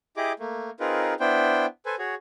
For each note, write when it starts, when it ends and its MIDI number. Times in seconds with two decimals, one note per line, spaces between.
0.17 0.33 64
0.17 0.33 67
0.17 0.33 68
0.17 0.33 75
0.17 0.33 86
0.40 0.70 57
0.40 0.70 58
0.80 1.14 60
0.80 1.14 63
0.80 1.14 65
0.80 1.14 68
0.80 1.14 70
0.80 1.14 71
1.20 1.66 59
1.20 1.66 62
1.20 1.66 64
1.20 1.66 72
1.20 1.66 79
1.86 1.95 69
1.86 1.95 71
1.86 1.95 72
1.86 1.95 80
1.99 2.15 66
1.99 2.15 68
1.99 2.15 73